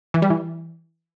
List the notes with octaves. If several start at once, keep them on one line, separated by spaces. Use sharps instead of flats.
E3
G3
E3